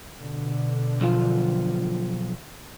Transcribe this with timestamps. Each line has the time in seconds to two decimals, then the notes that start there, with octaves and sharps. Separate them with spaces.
0.17 B2 D3
1.01 B1 F3 F4